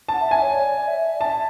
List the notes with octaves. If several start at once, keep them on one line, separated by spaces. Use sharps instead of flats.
F#5 A5
E5
G#5
C#5
D5
D5
E5
D5
E5 A5